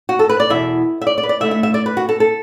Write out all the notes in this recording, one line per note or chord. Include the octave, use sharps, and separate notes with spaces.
F#4
A4
B4
D5
E2 B2 B3 E4 E5
E5
D5
D5
B4
D5
D3 A3 E4 E5
E5
E5
D5
B4
F#4
A4
A4